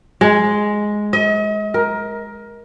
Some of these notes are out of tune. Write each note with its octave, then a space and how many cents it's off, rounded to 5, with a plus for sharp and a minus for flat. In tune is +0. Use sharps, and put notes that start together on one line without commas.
G#3 +5
D#5 +40
A#4 +15